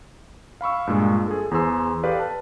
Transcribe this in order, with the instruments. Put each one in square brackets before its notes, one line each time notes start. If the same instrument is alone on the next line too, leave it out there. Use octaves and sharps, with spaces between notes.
[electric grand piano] F5 B5 C#6 E6
G2 A#2 G#3
G#4 A4
E2 G#4 C5 C6 E6
G4 A4 B4 D5 F5
A5